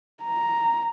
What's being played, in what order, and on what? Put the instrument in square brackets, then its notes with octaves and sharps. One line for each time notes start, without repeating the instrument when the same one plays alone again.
[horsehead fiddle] A#5